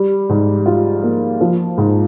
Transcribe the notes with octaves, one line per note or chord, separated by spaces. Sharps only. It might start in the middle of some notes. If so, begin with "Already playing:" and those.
Already playing: G3
G#2
F4
A#3
F3
G#2